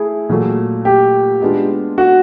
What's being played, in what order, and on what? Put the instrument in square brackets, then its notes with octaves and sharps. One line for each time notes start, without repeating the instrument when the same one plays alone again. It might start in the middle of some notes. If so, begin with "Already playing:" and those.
Already playing: [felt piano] A3 E4 [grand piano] G#4
[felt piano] A#2 F#3 A3
[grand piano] G4
[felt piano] G#3 B3 D4 F4
[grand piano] F#4